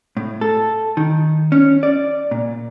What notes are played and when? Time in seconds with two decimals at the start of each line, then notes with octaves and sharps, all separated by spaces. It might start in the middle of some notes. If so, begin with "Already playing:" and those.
0.17 A2
0.41 A4
0.97 D#3
1.52 C#4
1.83 D5
2.31 A#2